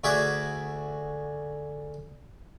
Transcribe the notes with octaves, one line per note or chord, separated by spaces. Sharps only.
D2 F#4 G#4 E5 D6 D#6